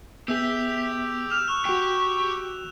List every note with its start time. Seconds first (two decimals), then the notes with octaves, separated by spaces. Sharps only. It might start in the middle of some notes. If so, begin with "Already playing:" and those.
0.28 B3 G4 G#4 E5 E6 G6 F7
1.30 F6 E7 F7
1.48 C#6 F#6
1.65 F#4 G4 G5